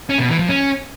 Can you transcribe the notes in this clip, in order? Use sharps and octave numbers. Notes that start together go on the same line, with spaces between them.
C#4
B2
E3
F3
C#4